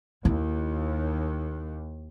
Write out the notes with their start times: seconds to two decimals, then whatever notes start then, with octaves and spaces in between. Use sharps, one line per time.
0.25 D#2 E4